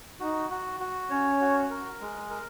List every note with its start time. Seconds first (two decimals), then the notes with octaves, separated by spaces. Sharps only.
0.19 D#4 F#4
0.50 F#4
0.80 F#4
1.10 C#4 C#5
1.41 F#4
1.70 A#4
2.01 G#3
2.30 A#4